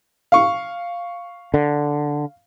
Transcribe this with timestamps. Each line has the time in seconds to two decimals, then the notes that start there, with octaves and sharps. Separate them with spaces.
0.32 F5 C#6
1.54 D3